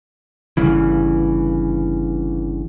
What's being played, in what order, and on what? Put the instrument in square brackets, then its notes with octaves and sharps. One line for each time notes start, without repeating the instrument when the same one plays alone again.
[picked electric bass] G1 G2 C#3 E3